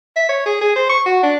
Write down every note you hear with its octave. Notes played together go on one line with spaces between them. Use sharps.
E5
C#5
G#4
G#4
C5
C#6
F#4
D4